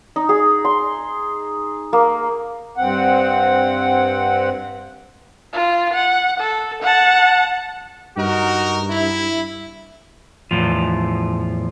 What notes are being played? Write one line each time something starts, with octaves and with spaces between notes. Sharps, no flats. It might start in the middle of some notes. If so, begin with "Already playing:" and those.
D#4
G#4
C6
A#3
G2 C4 F#5
F4
F#5
A4
F#5 A5
G2 D#4 F#4 A#4
E4
E2 A2 F3